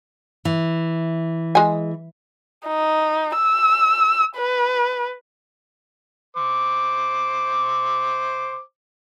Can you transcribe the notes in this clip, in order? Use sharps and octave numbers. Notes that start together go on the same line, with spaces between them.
E3
G#3 G#5
D#4
E6
B4
C5 D6